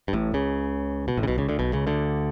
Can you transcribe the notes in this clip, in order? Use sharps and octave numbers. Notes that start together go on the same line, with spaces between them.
G2
A1 A2
C#2 C#3
B2
A1 A2
C#3
B1 B2
C#2 C#3
D2 D3
B1 B2
C#2 C#3
D2 D3